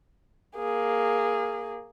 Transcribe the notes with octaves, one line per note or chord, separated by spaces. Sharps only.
A#3 G#4